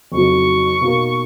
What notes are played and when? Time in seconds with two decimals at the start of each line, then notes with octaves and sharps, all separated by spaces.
0.12 F2 C#3 F#3 A#3 D#4 C#6
0.81 B2 A#3 D#4 A#4